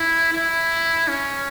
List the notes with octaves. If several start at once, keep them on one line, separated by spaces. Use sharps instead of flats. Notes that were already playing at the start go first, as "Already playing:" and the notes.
Already playing: E4
E4
C#4